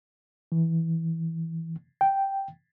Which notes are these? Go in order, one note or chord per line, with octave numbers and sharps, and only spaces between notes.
E3
G5